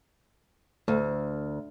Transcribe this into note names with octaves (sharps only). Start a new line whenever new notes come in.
D2 A3